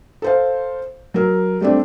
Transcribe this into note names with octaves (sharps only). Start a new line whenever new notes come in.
A4 C5 F5
F#3 A#4
G3 A3 C4 D4